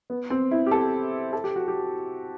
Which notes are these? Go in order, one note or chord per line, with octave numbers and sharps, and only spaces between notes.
B3
C4
E4
G4
A4
A4
G4
F#4
G4